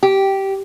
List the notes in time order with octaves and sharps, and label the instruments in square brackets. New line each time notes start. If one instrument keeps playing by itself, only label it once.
[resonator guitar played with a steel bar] G4